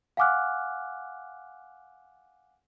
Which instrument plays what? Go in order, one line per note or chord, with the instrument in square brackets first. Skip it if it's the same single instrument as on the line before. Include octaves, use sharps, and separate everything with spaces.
[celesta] F5 F#5 G#5 D6 F6 F#6